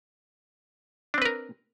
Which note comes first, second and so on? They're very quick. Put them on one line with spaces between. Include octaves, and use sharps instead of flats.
D4 C4 B4 A#4